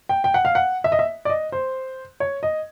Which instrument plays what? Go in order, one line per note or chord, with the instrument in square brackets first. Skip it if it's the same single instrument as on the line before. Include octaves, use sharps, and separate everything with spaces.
[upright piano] G5
G5
F#5
F5
F#5
E5
D#5
E5
D5
D#5
C5
C#5
D#5